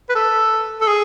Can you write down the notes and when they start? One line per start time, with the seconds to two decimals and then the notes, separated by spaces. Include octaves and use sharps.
0.10 B4
0.15 A4
0.81 A4
0.87 G#4